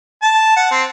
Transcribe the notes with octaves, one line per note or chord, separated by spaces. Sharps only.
A5
F#5
C4